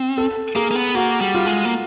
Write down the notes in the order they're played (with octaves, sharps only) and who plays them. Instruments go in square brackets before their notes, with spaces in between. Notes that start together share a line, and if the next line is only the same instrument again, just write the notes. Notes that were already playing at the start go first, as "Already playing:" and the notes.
Already playing: [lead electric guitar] C4
[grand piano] A4
[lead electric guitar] A#3 [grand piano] G#4
[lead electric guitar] A#3
B3
[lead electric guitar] A#3 [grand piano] F#4
[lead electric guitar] G3
[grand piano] F4
[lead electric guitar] G#3
A#3